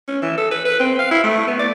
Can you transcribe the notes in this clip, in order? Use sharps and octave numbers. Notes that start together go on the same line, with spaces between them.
C#4
E3
A4
B4
B4
C4
F5
E4
A3
B3
D5